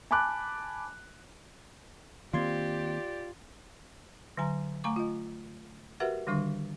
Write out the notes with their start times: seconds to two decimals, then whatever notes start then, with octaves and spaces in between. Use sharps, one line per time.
0.11 G#5 A5 B5 D6 F#6
2.34 D#3 A#3 C4 F4 G4 D5 C6 G#6
4.37 D3 F#3 G#5 A#5
4.84 A3 F5 G#5 A#5 C#6 D6
4.96 F4 D#5
6.00 F#4 G4 A#4 B4 E5 F#5
6.27 D3 D#3 G3 D4 C#6